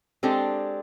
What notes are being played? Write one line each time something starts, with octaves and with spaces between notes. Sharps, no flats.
G#3 C4 D4 G4 A4